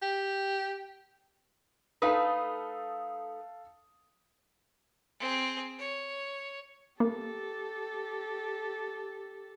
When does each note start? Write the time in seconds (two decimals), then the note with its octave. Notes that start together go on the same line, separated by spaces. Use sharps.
0.02 G4
2.02 A3 D#4 A4 B4 F5 D#6
5.20 C4 G#4
5.79 C#5
7.00 A#3 G4 A4